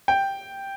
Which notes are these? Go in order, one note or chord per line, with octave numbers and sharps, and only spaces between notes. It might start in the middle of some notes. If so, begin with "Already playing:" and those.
G5